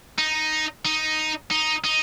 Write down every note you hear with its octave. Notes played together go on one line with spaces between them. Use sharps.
D#4
D#4
D#4
D#4